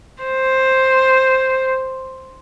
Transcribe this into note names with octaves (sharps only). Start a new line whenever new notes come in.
C5